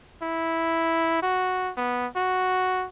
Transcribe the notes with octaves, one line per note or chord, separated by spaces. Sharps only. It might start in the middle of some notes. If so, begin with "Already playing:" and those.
E4
F#4
B3
F#4